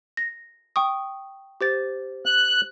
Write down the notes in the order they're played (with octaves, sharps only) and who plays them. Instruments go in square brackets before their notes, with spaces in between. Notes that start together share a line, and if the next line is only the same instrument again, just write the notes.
[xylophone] A#6
G5 C#6 D#6
G4 C5 A6
[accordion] F#6